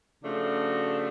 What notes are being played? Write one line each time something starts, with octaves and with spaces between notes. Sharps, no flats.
C#3 F3 A3 D4 F#4